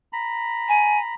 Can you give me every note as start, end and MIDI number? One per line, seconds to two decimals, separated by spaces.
0.13 1.15 82
0.13 1.15 83
0.69 0.99 80